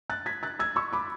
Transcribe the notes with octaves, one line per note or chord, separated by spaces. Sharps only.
F#6 A6
G#6 B6
F#6 A6
E6 G#6
C#6 E6
B5 D6